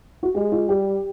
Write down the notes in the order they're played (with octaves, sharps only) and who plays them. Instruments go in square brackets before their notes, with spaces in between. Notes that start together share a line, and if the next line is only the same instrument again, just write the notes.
[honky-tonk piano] F#4
[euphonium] G#3 [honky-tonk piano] G4
[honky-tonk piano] F4
[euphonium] G3 [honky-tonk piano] G4